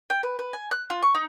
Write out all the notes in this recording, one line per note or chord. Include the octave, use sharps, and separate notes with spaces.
G5
B4
B4
G#5
F#6
F4
C#6
D#4